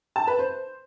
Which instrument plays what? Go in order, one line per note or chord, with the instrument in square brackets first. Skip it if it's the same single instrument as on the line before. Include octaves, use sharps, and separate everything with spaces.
[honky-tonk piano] A5
B4
C5